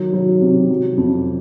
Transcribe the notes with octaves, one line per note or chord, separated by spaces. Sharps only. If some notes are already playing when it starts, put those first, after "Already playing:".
Already playing: D#3 F#3
F#3
C3
F#3
F2